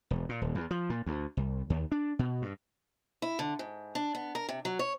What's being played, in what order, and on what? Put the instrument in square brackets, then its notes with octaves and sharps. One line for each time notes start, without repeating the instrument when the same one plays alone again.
[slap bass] E1
A#2
D#1
E2
F3
A#2
D2
C2
D#2
D4
B2
G2
[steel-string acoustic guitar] E4
D3
G#2
D4
B3
A#4
C3
F#3
C#5